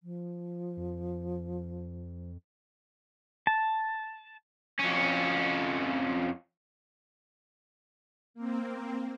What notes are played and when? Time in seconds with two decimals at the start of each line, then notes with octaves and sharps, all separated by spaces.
0.03 F3
0.77 F2
3.47 A5
4.79 F2 C#4
8.34 A#3 C4